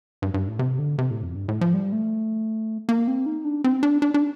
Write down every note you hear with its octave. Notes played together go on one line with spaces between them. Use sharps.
G2
G2
A2
C3
D3
C3
A2
F2
G2
A2
F3
G3
A3
A#3
C4
D#4
D4
C4
D4
D4
D4